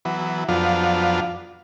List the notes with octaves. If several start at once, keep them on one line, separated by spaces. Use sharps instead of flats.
E3 F#3 B3
F2 F3 F#3 B3 D4 F4